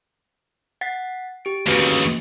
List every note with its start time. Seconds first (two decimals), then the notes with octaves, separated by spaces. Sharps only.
0.81 F#5 A6 B6
1.45 G4 D7
1.67 D#2 C#3 A3 F#4 B4